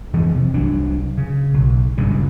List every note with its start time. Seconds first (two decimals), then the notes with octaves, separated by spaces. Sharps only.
0.13 F2 E3 F3 G#3
0.36 C3
0.54 C2 F#3 D4
1.17 C#3
1.54 B1
1.97 G1 C#2 G2 C#3